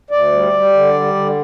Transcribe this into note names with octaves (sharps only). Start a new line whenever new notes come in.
D2 D5
G3
G3
D3
G3
D3